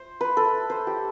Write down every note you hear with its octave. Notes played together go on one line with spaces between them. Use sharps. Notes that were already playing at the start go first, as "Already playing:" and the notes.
Already playing: C5
B4
A4
C5
G4